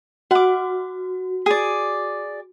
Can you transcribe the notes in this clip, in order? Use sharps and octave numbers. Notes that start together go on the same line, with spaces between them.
F#4 F#5 D6
G#4 D5